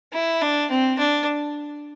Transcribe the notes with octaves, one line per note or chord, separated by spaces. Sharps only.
E4
D4
C4
D4